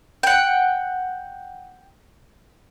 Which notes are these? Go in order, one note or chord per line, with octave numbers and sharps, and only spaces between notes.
F#5 G5